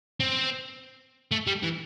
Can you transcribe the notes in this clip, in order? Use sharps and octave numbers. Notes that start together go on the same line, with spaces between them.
C4
A3
G3
E3